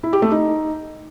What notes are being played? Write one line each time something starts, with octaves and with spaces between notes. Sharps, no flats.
E4
G4
A3
D#4